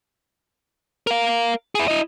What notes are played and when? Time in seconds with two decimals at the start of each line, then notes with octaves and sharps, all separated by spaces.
1.07 A#4 F5
1.75 E4 G#4
1.88 E4 D#5